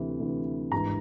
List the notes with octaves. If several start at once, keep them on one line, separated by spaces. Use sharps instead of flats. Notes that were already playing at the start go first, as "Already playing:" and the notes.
Already playing: D2 C3 E3
D2 C3 E3
G#1 G2 E3 A#5